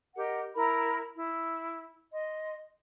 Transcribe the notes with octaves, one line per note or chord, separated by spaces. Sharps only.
G4 A#4 D#5 F#5
E4 A#4 A#5 B5
E4
D#5 C6